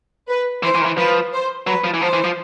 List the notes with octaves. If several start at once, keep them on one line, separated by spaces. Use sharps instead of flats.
B4
E3 C5
E3
D#3
E3
F3 B4
C5
F#3 B4
F3
E3
F3 C5
E3
F3